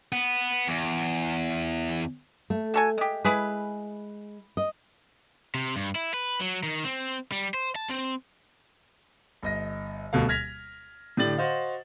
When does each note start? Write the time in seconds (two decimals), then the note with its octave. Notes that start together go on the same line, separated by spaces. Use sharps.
0.12 B3
0.67 E2
2.50 A3
2.74 F#4 A4 G#5
2.98 G#3 G4
3.25 G#3 E4 G#4 B4
4.57 D#5
5.55 C3
5.76 G2
5.95 E4
6.14 B4
6.41 F#3
6.63 D#3
6.85 C4
7.32 G3
7.54 C5
7.76 A5
7.89 C4
9.43 G1 D#5 A#6
10.13 D#1 D2 B2 A4 F5
10.29 F6 G#6 A#6 B6 F7
11.17 A2 D3 D4 G4 A6 F#7
11.38 F#4 C5 D#5 F5